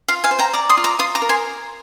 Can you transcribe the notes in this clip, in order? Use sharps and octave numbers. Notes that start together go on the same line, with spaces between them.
F4 F5
F5 G#5
C5
G5 A#5
D5 A#5 D6
C6 D#6
F4
A#5 D6
F4 C6 D#6
A#5 D6
A#4
G#5 C6